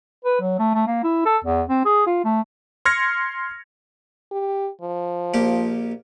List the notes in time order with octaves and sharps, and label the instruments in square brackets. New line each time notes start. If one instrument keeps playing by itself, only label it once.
[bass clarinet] B4
F#3
A3
A3
A#3
E4
A4
E2
C4
G#4
F4
A3
[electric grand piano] C6 F6 G#6 A#6 C#7
[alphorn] G4
F3
[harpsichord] A#1 A#3 G4